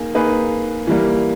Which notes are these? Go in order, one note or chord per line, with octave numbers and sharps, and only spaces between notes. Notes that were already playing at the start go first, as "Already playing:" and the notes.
Already playing: A#3 D#4 G#4
A#3 D#4 G#4 B4
E3 G3 A#3